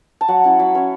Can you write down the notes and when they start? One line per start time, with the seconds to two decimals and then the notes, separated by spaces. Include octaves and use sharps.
0.21 A5
0.28 F#3 F#5
0.44 C#4 E4 A5
0.59 F#3 B5
0.75 C#4 E4 C#5